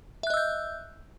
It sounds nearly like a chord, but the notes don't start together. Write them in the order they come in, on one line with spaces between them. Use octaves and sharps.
E5 F#6 D#5 E6 G6